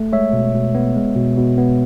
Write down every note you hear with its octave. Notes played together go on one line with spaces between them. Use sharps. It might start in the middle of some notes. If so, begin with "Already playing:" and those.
Already playing: A3
G#3 C#5 E5
B2
B2
B3
G#3
B2
B2
B3